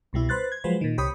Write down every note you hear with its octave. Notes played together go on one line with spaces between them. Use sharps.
C2 B2 G3 E4
B4 C5 F#6 A6
G#6
F3 F#3 G#3 B4 C5
A#2 D#3
C2 C3 G4 C#5 B5 D#6